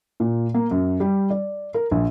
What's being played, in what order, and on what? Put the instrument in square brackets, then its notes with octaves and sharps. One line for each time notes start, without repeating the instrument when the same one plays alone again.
[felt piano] A#2
A#3
F#2
G3
D5
A#4
A#1